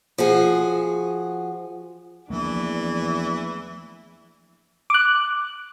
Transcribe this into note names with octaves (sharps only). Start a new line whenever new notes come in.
F3 F#4 G#4
E2 E3 F3 A3 A#3 D4
D6 F#6